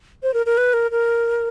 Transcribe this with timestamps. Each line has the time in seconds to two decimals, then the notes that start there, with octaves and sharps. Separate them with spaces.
0.23 C5
0.34 A#4
0.46 A#4
0.58 B4
0.74 A#4
0.91 A#4